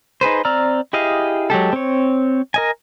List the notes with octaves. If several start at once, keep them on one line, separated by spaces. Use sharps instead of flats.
D#4 G#4 B4 C5
C4 D5 A#5 E6 F6
E4 G4 G#4 D#5 F5
F#3 G#3 G4 A4
C4 C#5
A#4 D#5 G#5